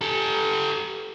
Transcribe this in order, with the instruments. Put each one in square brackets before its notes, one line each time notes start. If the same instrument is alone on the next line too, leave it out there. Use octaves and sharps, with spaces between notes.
[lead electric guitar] G4 A4